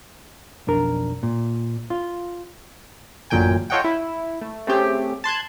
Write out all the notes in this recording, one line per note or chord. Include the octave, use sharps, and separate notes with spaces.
B1 F2 D4 A#4
A#2
F4
A1 F#2 A#2 D3 G5 G#5
F4 A4 C#5 D#5 F#5 G5
E4
A3
A3 C4 C#4 G4 G#4
A5 C6 F#6 G#6